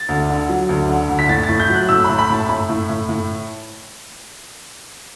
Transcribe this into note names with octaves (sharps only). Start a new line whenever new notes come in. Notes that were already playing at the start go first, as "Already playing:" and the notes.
Already playing: A6
D2
D3
F#3
D2
D3
D2
B6
A2 A6
A6
A2
G6
F#3 F#6
A2 E6
B5
A2
B5
A2 A5
A2 B5
A2
A2
A2